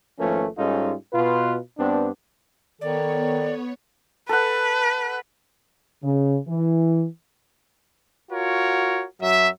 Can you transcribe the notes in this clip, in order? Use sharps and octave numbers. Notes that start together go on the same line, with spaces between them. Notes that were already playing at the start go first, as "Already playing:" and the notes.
G#1 F3 A3 A#3 C#4 B4
G#2 G3 C#4 D#4 F4 A4
B2 F4 B4
G2 B3 C4 D4
D#3 B3 A4 C#5 D5
A4 B4 F#5
C#3
E3
F4 F#4 A#4 C#5
F#2 F#3 E5